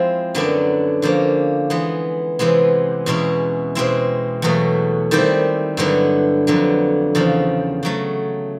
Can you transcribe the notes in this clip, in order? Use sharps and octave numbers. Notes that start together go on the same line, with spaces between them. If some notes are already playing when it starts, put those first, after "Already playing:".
Already playing: F3 G#3 C4 E4
F#2 D3 F#3 B3 D4
D3 F3 A#3 C#4
E3 G#3 B3
C3 E3 G#3 B3
E2 B2 G#3 C#4 E4
B2 G#3 C4 E4
E2 B2 F#3 A3
D#3 G3 C4 E4 G4
G2 D3 F#3 B3 E4
F2 D3 F#3 B3
E2 C#3 F3
C#3 F#3 A3